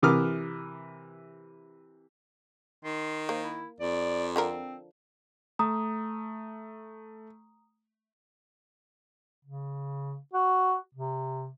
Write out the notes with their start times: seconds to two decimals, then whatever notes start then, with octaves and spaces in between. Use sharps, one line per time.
0.02 C3 E3 A#4 D6 D#6 F6
2.84 D#3 C6
3.29 A#3 C5
3.43 E4
3.80 F2 D5
4.36 D3 F3 C4 A#4
5.59 A3 A#5 D#6
9.45 C#3
10.33 F#4
10.95 C3